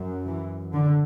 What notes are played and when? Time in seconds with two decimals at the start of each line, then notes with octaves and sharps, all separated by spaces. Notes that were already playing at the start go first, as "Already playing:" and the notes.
Already playing: F#2
0.27 E3
0.73 D3